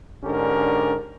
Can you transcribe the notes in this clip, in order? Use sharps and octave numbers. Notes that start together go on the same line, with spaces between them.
G#2 D3 C#4 D4 G4 A#4